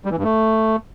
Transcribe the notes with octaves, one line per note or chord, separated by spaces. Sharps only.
G3
E3
G2
A3